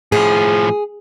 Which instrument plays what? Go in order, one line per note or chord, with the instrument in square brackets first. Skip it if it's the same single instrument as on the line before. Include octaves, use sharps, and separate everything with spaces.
[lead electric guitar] A2 F3 [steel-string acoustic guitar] G#4